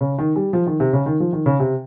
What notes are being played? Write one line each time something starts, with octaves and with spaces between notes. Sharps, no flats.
C#3
D#3
G3
F3
D#3
C3
C#3
D#3
F3
D#3
C#3
C3